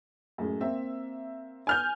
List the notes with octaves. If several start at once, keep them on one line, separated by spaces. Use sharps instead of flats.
F#2 A2 G#3
A#3 C4 E5
G#5 F6 G6